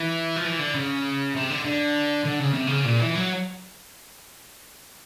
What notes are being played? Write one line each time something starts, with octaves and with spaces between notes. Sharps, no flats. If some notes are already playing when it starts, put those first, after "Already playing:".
Already playing: E3
F3
E3
D3
C#3
C3
D3
D3
D3
C#3
C3
C#3
A#2
E3
F#3